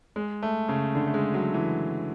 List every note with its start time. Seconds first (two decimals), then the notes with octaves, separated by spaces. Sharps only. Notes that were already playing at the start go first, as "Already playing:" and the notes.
0.16 G#3
0.43 A3
0.69 C#3
0.95 D3
1.07 A3
1.14 G#3
1.34 F#3
1.54 E3